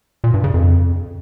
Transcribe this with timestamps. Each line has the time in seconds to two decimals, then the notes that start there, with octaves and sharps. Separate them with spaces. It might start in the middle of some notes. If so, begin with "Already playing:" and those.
0.24 A#2
0.34 G2
0.44 C#3
0.54 F2